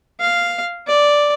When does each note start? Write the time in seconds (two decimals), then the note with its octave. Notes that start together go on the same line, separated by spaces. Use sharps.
0.20 F5
0.87 D5